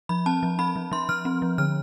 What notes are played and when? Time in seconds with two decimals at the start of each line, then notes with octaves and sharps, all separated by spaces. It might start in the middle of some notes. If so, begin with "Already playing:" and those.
0.09 F3 B5
0.26 C4 A5
0.43 F3
0.59 C4 B5
0.76 F3
0.92 F3 C6
1.09 F3 F6
1.25 C4
1.42 F3
1.58 D3 F6